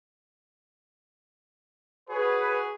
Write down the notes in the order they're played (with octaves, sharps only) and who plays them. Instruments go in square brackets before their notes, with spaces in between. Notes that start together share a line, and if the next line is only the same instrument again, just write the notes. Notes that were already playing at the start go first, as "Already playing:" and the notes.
[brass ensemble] F#4 B4 C#5 [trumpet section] G#4